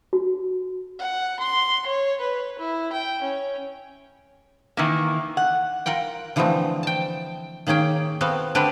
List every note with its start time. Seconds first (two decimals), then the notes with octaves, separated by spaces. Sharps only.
0.13 F#4
0.99 F#5
1.40 C6
1.86 C#5
2.21 B4
2.59 E4
2.92 G5
3.22 C#4
4.77 D#3 E3 A#3
5.37 F#5
5.86 F4 A#4 F#5 G5
6.36 D3 E3 F3 G#3 A3 C4
6.83 G5 A5
7.67 D#3 A#3 C#4 G#4 G5
8.21 B3 C4 F#4 A4 F5
8.55 D3 C4 D4 G4 A4 B4